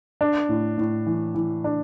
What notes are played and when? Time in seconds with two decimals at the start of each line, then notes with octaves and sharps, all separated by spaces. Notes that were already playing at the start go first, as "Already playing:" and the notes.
0.21 D4
0.49 A2
0.78 A2
1.06 E3
1.35 E3
1.64 D4